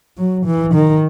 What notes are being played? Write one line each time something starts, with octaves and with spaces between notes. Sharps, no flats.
F#3
E3
D#3